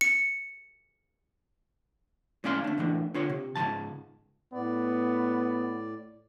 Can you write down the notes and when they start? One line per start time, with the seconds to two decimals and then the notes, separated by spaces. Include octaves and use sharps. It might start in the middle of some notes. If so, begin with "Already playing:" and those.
0.01 C#7
2.44 A2 G#3 C#4 D5 F5 C6
2.64 A3 D4
2.78 A2 E3 D4
3.14 D3 F4 C#5
3.29 C3
3.55 C#2 G#2 C3 E3 A5
4.53 A2 B3 D5